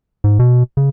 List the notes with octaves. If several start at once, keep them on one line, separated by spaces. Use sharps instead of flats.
G#2
B2
C#3